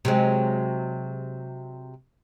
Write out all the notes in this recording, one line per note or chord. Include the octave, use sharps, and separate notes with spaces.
C3 F#3 G#3